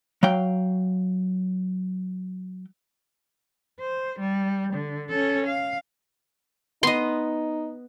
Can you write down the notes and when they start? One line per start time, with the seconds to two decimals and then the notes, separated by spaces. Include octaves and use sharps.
0.23 F#3 F5 G5
3.80 C5
4.19 G3
4.74 D3
5.10 C#4 A4
5.47 F5
6.83 B3 D#4 D#5 C6